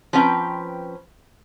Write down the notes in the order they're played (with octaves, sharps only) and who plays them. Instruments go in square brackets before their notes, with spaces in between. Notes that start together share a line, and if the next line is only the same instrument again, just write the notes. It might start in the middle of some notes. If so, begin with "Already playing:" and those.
[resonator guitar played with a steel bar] F3 C4 C#4 B4 G5 A#5